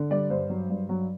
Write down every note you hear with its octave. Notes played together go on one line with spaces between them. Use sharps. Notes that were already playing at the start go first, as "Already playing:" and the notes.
Already playing: D3
G3 D5
G2 C5
F#3
G2
F#3